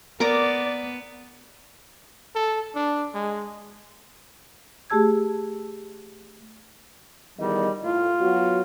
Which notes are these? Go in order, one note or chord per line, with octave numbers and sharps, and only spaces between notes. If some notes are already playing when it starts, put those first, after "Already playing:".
B3 A#4 D5 A#5 D6
A4
D4
G#3
A3 G4 G#4 A5 E6 G#6
E2 D#3 G3 D#5
A2 F4
F#3 B3 F#4